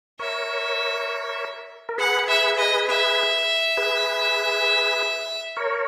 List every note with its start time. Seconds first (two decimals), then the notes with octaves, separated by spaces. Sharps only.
0.19 A#4 C#5 E5
1.89 A#4
1.98 G#4 B4 F#5
2.28 E5
2.58 D#5
2.88 E5
3.77 G#4 B4
5.57 A#4 C#5